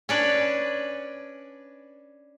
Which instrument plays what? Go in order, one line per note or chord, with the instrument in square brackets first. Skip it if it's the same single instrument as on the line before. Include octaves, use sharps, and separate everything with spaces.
[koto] C#4 D4 B4